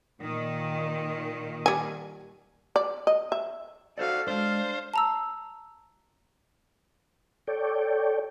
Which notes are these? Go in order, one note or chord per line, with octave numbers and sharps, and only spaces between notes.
A#2 D#3
G3 G#5
D5
D#5
E5
F#4 A4 C5 D5 F5
G#3 D4 C5 F5
A5 A#5 E6
A4 C#5 D5 G5